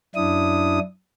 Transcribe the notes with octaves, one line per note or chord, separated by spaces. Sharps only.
F#2 D4 E4 D#6